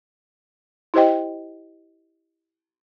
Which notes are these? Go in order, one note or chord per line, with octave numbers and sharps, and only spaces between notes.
E4 G4 C5 D#5 G5